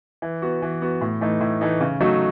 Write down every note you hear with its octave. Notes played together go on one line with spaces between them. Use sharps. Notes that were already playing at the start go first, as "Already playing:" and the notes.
E3
B3 F#4
E3
B3 F#4
A2
E3 A3 D#4
A2
E3 A3 D#4
C#3
F#3 A3 D#4 F#4